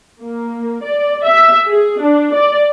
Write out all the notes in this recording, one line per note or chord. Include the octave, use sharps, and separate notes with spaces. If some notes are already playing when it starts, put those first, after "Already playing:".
A#3
D5
E5
G#4
D4
D5